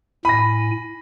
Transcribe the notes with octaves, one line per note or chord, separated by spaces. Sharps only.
A2 G#5 B5 A#6